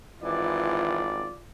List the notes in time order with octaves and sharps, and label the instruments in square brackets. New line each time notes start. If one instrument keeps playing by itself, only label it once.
[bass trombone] G#1 [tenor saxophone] E3 [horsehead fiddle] F4 [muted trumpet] D5